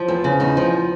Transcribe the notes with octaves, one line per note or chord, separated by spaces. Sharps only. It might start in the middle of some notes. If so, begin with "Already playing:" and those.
Already playing: F3
E2
C#3
E2 D#4
F3